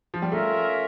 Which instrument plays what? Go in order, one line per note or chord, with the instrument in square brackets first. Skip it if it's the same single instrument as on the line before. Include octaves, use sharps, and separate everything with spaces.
[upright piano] F3
G3
[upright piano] A3 [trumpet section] C#4 F4 A#4 E5